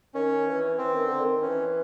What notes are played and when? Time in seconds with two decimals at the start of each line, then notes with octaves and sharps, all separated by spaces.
0.14 D#3 C#4
0.47 E3
0.78 E3 C4
0.92 D#3
1.06 D3
1.20 D#3
1.42 E3 C#4